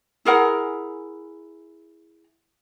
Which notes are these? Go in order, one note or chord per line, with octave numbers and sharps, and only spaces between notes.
E4 G#4 A#4 F#5